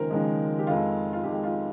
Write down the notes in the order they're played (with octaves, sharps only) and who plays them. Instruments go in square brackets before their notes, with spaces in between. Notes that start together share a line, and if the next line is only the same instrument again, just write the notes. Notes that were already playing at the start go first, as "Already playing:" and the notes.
Already playing: [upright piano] D#2 C#3 F3 G#3 A#4 C5
D#2 C#3 F3 G#3
G4
F2 D#3 G#3 F4
F4
F2 D#3 G#3 G4
F4